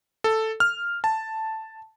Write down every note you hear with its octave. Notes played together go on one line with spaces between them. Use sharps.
A4
F6
A5